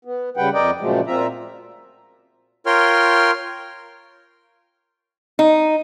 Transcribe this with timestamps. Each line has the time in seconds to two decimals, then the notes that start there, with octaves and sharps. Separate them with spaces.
0.05 B3
0.37 C#3 G3 B4 F#5 G5
0.54 F2 A#4 D5 D#5 G5
0.81 A#2 C#3 F3 F#3 G#3 A3
1.07 A#2 C4 F4 E5 A#5
2.66 F4 A#4 C#5 G5 C6 F6
5.39 D#4